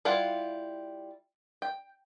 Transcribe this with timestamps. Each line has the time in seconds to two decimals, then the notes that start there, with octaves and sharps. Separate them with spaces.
0.05 G3 E4 F4 F5 F#5
1.62 G5